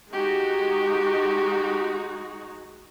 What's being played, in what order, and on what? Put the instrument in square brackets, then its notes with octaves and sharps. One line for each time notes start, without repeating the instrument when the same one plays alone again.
[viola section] G#3 D#4 F#4 [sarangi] G4